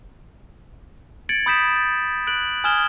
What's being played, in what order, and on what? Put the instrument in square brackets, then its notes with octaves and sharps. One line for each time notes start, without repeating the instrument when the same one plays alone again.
[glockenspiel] G#6 A6 C#7 D7 F#7
B5 D#6 G6 B6 E7
A6
F#6 D7 F#7
G#5 D#6 F6 G#6 E7 G7